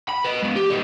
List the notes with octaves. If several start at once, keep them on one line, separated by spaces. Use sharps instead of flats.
B5
B4 D#5
G#3 B3
G4
G3 D#4